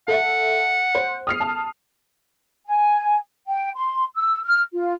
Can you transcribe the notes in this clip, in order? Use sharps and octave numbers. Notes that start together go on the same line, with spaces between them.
A4 E5 F#5
C5
D#6 F6 C7
A5 D#6
G#5
G5
C6
E6
F6
F4